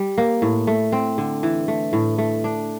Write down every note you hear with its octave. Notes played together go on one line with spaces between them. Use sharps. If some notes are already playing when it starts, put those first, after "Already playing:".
Already playing: G3
A#3
A2
A3
C4
D3
E3
A3
A2
A3
D4